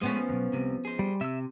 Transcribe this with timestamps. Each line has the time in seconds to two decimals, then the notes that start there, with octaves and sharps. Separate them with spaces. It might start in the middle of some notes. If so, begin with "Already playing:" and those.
0.01 F3 G#3 A3 B3 C#4
0.29 B1 E2
0.53 C2 C3
0.85 G#4 C5
0.99 G3
1.21 C3 E5 E6